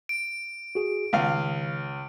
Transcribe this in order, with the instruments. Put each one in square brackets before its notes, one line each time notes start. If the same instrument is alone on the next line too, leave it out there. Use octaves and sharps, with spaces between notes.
[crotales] D7
[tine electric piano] F#4 G#4
[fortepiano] C#2 F5 [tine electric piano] D#3